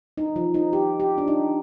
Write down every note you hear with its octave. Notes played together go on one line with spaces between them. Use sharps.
D#4
F3
D#4
G4
G4
D4
D#4